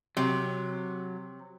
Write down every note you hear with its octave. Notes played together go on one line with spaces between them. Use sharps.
C3 F#3